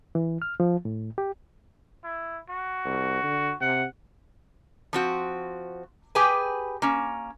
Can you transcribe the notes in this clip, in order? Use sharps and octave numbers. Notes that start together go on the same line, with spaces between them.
E3
F6
F3
A2
G4
E4
F#4
C2
D3
C3 F#5
F3 C4 F#4
G4 G#4 B4 G5 G#5
A#3 C#4